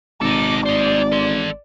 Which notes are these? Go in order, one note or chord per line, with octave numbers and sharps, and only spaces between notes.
G#1 D#4 A4 D6
C5 D5 D#5
A4 C6